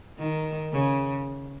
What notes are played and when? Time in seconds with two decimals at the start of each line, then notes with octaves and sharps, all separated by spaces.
0.18 D#3
0.72 C#3